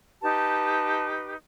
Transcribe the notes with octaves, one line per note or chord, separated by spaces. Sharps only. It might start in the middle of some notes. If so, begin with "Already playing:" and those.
D#4 G4 B4 A5